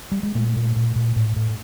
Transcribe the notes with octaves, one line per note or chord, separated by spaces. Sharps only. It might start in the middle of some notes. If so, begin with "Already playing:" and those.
G3
G#3
A#2 A3
A#2
A#2
A#2
A2
A2